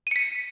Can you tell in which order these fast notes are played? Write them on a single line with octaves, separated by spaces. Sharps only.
D#7 C#7 B6